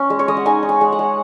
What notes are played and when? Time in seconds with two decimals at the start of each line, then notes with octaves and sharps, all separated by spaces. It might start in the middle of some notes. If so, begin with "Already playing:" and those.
Already playing: C#4
0.10 G#3
0.19 C#5
0.28 G#3 D#5
0.37 F#5
0.46 D#4 G#5
0.63 D#4
0.69 G#5
0.81 G#3
0.92 F#5
0.99 G#3